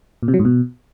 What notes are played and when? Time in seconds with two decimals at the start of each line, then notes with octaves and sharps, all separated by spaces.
0.23 A#2
0.28 C3
0.34 F#3
0.39 G#2
0.45 B2